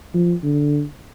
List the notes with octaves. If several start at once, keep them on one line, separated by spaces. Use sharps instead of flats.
F3
D3